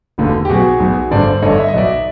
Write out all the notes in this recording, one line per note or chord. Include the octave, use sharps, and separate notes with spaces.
E1 D#2 D3
G4
B1 B2 F#3 F#4 G#4
B1 B2 F#3
G1 G2 D3 C5 D5
G1 G2 D3 C#5 D#5
E5
D#5
B1 B2 F#3 D5 E5